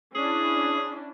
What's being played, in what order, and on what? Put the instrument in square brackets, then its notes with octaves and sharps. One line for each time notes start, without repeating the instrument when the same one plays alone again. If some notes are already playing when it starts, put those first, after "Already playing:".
[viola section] C#4 D4 E4 [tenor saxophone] G#4